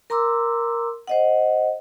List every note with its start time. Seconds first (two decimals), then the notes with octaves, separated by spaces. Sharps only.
0.10 A#4 A#5 C6 D6 E6
1.07 C5 D#5 F#5